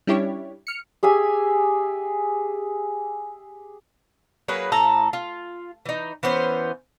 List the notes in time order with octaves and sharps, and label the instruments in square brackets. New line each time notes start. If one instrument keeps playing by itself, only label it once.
[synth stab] G3 C#4 D4 E4 G4 C#5
F6 C#7
[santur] G4 G#4 E5 G#5
[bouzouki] F#3 A#3 G#4 B4
A2 A4 A#5
F4
E3 D#4
E3 B3 C#4 C5